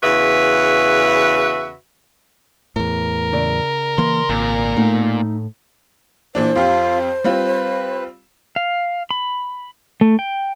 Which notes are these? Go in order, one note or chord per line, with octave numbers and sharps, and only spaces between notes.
E2 C#3 F#4 B4 E5
E2 A2 A#4
C#3 E4 D5
E3 A#3 C6
G#1 A#2
A2 A3 D#4 F#5
A#2 E3 D4 C5
F2 F4 G4 F5
G3 C4 F4 B4
F5
B5
A3
G5